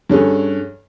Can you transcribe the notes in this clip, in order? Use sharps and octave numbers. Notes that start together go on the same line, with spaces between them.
G2 C#4 G#4 A4